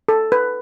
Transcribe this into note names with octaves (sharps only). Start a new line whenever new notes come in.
A4
B4